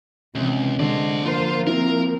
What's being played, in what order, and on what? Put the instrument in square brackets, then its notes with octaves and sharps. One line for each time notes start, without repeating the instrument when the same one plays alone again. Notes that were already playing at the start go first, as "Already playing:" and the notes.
[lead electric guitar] C#2 [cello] C3 E3
[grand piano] D3 [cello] G#3 [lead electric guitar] C5 D5
[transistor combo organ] F3 A#3 [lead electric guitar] F4 [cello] C5
[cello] C4 [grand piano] E4 [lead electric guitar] A#4